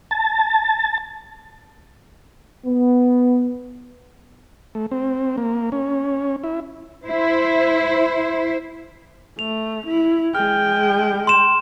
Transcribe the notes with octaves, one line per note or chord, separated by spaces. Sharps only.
A5
B3
A3
C4
A#3
C#4
E4
E4 C5
A3 F7
E4
G#3 G5 F6
C6 E7